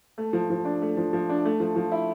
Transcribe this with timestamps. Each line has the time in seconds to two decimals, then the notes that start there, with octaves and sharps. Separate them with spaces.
0.18 A3
0.33 F3
0.50 F3
0.65 D4
0.82 A3
0.97 F3
1.13 F3
1.29 D4
1.45 A3
1.60 F3
1.76 F3
1.92 E4